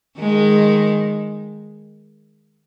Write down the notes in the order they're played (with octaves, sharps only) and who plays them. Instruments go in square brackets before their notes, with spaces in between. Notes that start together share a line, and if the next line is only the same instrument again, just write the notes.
[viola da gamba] D#3 G#3